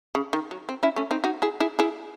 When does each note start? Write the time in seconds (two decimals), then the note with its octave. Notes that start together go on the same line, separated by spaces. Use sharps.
0.15 C#3
0.33 D#3
0.51 F#3
0.69 C4
0.83 C#4 E4
0.96 A3 C#4
1.11 C4 D#4
1.24 D#4 F#4
1.42 E4 G#4
1.60 E4 G#4
1.79 E4 G#4